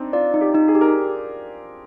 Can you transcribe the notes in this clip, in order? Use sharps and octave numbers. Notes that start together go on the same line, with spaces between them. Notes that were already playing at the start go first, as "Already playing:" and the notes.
Already playing: C4 D4 D#4
F4 D5
D#4
G4
D#4
G#4
G4
A#4